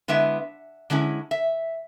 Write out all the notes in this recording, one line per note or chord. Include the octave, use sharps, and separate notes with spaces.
D3 G#3 B3 E4 E5
D3 G#3 C#4 E4
E5